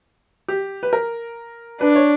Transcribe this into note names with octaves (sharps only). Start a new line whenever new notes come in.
G4
B4
A#4
D4 B4
C#5